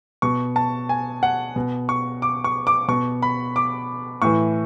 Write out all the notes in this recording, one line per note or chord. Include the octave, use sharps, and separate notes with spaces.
B2 C#6
A5
G#5
F#5
B2
C#6
D6
C#6
D6
B2 C#6
B5
D6
A2 E3 C#6